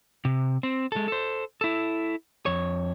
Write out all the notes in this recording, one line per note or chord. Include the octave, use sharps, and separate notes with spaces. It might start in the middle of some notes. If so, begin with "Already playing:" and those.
C3
C4
G#3 A4
A4 C5
E4 A4
F2 C#5